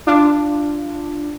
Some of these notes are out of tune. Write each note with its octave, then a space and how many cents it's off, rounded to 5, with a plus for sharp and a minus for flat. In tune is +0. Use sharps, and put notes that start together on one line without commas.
D4 +5 F4 -15